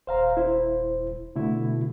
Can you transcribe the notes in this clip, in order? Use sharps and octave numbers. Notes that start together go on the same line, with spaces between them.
D#1 C5 F5 A#5
E4 C5
B2 D3 A3 E4